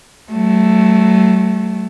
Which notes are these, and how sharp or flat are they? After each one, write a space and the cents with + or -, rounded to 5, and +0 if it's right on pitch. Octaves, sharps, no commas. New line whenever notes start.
F#3 +35 A3 +0